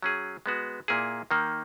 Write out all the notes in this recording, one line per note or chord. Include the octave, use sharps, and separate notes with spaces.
F#3 C#4 G#4
G#3 B3 F#4
A#2 A#3 E4 G#4
D#3 A#3 D#4